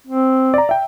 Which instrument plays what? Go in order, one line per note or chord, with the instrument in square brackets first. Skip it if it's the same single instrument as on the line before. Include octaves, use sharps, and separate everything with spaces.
[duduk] C4
[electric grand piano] D5 A#5
E5 G5